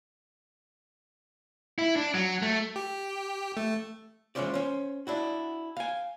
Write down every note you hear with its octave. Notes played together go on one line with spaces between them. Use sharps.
E4
D4
F#3
A3
G4
A3
E3 G#3 C#4 F4 C5 D5
C#4 C5
D4 E4 F#4
F5 G#5